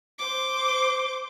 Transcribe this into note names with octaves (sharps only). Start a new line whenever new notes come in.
C5 D6